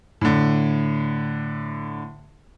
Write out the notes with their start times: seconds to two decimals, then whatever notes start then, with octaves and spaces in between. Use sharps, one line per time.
0.21 A2 D3